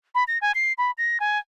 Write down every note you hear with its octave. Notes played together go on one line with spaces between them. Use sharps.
B5
A#6
G#5
C7
B5
A#6
G#5